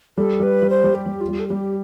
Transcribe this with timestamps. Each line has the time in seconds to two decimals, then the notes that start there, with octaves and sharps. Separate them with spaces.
0.17 G3 A4
0.40 G3 B4
0.62 G3
0.70 C5
0.84 G3
0.95 G4
1.06 G3
1.21 F4
1.28 G3
1.39 A4
1.48 G3 G4